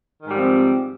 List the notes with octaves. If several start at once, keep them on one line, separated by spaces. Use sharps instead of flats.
G#2 D#3 F3 G3 C4